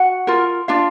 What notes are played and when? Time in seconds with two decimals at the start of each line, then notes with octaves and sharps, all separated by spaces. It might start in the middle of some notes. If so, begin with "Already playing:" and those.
Already playing: F#4 F#5
0.27 F4 A#4
0.68 D4 F4 F5